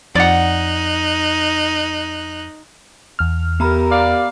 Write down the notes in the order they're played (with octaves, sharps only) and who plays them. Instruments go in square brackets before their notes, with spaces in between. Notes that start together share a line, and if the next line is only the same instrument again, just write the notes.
[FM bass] F2 [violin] D#4 F#6 [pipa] D5 F#5
[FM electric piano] E2 F6
[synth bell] B3 A#5 B5 [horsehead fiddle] G4 A#4
[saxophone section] D5 F5